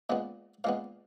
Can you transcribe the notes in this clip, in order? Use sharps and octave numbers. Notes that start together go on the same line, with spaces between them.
A#2 G#3 B3
A#2 G#3 B3 F5